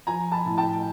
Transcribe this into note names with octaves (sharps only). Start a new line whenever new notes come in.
F3 G#5 A#5
A5 B5
A2
G5 A5